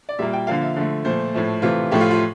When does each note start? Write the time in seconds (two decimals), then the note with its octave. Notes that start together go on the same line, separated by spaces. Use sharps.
0.09 D5
0.19 A#2 G3 A#3 E5
0.33 G5
0.47 D3 F3 A#3 F5
0.61 E5
0.76 D3 F3 A3
1.05 A#2 F3 A3 C5
1.34 A2 F3 A3
1.62 C3 E3 A3 F4
1.91 A2 F3 A3 G4
2.01 F4
2.11 F4